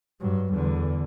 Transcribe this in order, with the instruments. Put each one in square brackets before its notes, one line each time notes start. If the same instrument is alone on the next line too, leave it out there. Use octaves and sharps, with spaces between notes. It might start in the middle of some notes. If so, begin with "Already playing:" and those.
[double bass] G2 F#3
E2 D3